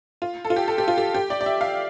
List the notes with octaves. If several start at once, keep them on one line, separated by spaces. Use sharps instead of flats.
F4
A4
F4
G4
A4
G4
F4
G4
G4
D5
D5
E5
F5